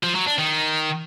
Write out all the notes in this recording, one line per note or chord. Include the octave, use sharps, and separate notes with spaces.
F3
F#3
D4
D#3